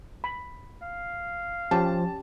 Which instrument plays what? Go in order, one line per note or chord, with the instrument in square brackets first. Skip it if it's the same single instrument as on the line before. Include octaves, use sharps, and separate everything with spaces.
[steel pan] B5
[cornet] F5
[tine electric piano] F3 [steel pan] C#4 G4 [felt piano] A5